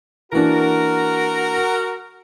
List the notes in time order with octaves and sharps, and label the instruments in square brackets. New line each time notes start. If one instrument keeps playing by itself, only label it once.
[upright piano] E3 A#3 D4 [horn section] F#4 A#4